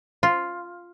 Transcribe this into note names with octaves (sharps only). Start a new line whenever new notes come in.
F4